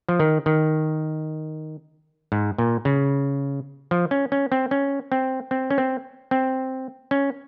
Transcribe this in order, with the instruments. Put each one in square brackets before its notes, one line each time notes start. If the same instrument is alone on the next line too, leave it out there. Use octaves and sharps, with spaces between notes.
[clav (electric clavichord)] F3
D#3
D#3
G#2
A#2
C#3
F3
C#4
C#4
C4
C#4
C4
C4
C#4
C4
C4
C#4